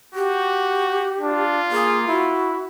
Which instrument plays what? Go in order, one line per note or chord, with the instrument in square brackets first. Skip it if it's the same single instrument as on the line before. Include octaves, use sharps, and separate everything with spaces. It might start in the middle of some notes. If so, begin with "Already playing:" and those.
[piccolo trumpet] F#4 [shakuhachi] G4
[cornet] D4 [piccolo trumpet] F4
[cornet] A#3 [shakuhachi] G#4
[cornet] E4 [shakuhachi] F#4